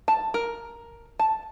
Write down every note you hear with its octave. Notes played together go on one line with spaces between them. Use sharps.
A5
A#4
A5